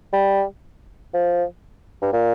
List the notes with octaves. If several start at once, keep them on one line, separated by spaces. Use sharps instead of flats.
G3
F3
G2
A#2